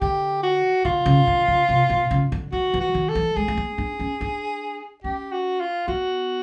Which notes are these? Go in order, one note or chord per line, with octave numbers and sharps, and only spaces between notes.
D3 G4
F#4
D3 F4
C#3
D3
C#3
C3
B2
C#3
D3
D#3 F#4
E3
F#4
D#3
A4
E3
G#3 G#4
A3
A#3
D4
C#4
D4
C#4 G4
F#4
F4
B3 F#4